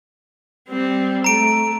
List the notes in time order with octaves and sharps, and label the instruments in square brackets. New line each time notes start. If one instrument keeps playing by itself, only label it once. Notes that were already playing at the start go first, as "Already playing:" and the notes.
[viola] G3 C4
[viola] A3 [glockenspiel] A#5 D7